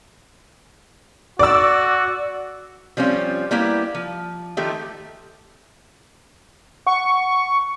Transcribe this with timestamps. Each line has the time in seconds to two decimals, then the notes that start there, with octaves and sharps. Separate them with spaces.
1.39 F#4 D5 E6
2.97 F3 G3 C4 C#4 F4
3.51 G3 A#3 B3 E4 G4
3.95 F3
4.57 D#3 F3 A3 G4
6.87 F#5 C#6